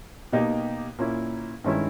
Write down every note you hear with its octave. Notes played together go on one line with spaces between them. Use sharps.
B2 A#3 D#4 G4
A#2 A#3 C#4 E4
G2 D#3 G#3 C#4 E4